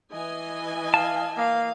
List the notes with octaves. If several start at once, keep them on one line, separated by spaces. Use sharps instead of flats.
E3 D#5 G#5
F5 A5
A#3 F5